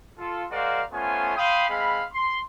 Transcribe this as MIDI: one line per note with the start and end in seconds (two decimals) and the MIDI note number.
0.18 0.44 65
0.18 0.44 69
0.51 0.81 56
0.51 0.81 66
0.51 0.81 70
0.51 0.81 72
0.51 0.81 74
0.51 0.81 77
0.92 1.33 57
0.92 1.33 59
0.92 1.33 61
0.92 1.33 65
0.92 1.33 72
0.92 1.33 80
1.36 1.64 77
1.36 1.64 79
1.36 1.64 83
1.36 1.64 84
1.36 1.64 87
1.69 2.04 56
1.69 2.04 60
1.69 2.04 77
1.69 2.04 83
2.12 2.38 84